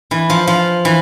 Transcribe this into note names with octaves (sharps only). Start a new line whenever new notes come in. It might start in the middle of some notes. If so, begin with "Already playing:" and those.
E3
F3
F3
E3